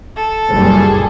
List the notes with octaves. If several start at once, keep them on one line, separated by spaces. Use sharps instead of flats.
A4
F#1 A#2 C#3 G3 G#4